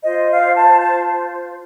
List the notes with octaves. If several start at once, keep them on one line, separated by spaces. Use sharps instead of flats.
F4 C5 D#5
F5
A5
A5